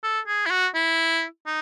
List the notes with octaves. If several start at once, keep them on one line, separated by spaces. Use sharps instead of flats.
A4
G#4
E4
F#4
E4
D#4